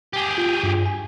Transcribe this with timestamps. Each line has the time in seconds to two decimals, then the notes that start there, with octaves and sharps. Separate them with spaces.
0.13 G4 G#4
0.38 F4
0.63 G2 F4
0.86 G#5